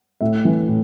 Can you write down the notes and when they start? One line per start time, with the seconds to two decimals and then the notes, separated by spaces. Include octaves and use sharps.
0.21 A2 E5
0.45 E3
0.68 A2